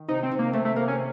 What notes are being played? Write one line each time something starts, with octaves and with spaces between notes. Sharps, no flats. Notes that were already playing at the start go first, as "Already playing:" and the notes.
Already playing: D#3
C3 D#4
C4
C3
A#3
C3 A3
A3
C3 A#3
C#4